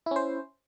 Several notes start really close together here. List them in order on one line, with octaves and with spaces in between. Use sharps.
E4 C#4 C5